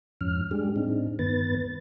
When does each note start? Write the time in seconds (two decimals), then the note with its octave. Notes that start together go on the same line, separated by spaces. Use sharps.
0.21 F2 G#2 F3 C#4 F6
0.51 G3 G#3 D4 G4 G#4
0.76 A2 C4 D4 D#4
1.19 G2 D#3 B3 B4 A6